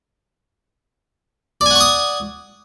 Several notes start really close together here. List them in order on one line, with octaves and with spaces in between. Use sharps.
D5 G#5 F#5 C#6 D#6